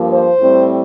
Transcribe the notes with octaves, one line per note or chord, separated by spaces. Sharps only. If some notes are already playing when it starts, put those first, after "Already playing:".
Already playing: G2 F3 A#3
C5
A2 G3 C4